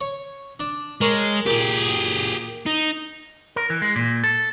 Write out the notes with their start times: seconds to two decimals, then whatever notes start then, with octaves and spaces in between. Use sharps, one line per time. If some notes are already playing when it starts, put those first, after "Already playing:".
0.01 C#5
0.60 D4
1.01 G#3 A#4 C#5 A5
1.47 A#2 G4 G#4
2.66 D#4
3.56 A#4
3.70 E3
3.82 G#3
3.96 A#2
4.24 A4